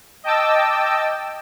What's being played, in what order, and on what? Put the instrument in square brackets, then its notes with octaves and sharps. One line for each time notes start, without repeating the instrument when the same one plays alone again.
[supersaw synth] D#5 G5 A5 D6 E6